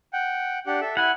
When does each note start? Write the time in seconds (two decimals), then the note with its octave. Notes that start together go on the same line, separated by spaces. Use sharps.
0.13 F#5 G5
0.67 D4 G4 F#5
0.81 A4 E5
0.97 E4 F#5 G#5